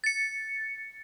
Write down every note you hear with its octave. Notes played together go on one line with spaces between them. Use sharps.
A6 C#7